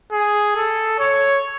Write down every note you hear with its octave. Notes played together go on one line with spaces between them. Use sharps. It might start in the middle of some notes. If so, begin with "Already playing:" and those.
G#4
A4
C#5